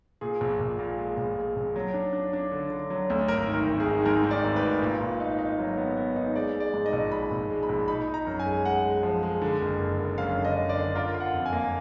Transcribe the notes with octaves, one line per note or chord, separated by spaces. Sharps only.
A#2 G#4
A#1
A#1
A#2
G#3
A#1
G#3
A#1
F#3
D4
D4
D4
D3
D3
F#3
D2
G#1 A#4
D#3
A#4
G#1
G#4
D#3
G#2 A#4
D#3
D5
G#1
B4
G#1
A#2
A#2
D#4
D#4
F#3
B3
B3
D#4
G#3 D5
G#3
D5
G#2
D#5
A#1
G#3 B5
A#1
G#3
B5
A#1
D#4 B5
D#4
A#5
F#2
G#5
G#3
G#3 F#5
G#3
F3
G#3
D3
F#1
F#1
F#1
F#2 F5
D3
D#5
F#1
D5
D3
F4 A#4
F4
F#5
F2
G#5
A#3